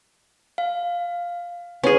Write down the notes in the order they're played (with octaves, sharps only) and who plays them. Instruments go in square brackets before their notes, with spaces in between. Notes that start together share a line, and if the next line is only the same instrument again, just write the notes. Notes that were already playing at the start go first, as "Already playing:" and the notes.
[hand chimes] F5
[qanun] C#4 G#4 [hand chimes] B4